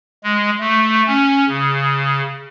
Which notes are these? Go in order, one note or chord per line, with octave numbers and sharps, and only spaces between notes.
G#3
A3
C#4
C#3